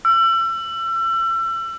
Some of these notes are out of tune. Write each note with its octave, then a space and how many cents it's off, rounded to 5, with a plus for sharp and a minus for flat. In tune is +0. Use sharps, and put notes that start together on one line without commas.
E6 +35